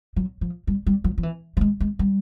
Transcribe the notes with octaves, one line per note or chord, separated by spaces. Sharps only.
F#3
F3
G3
G3
F#3
F3
E3
G3
G#3
G#3
G3